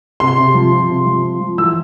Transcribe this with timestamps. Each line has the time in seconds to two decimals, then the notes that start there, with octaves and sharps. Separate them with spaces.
0.20 C3 C6
0.38 C3
0.54 F3
0.72 F3
0.89 C3
1.06 F3
1.23 F3
1.40 F3
1.58 E3 E6